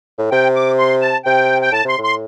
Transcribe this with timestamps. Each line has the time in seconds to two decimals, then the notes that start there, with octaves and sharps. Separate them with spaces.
0.18 A2
0.31 C3 G5
0.56 D6
0.79 C6
1.01 A5
1.25 C3 G5
1.62 G5
1.72 A2 A5
1.85 C3 C6
1.98 A2
2.04 C6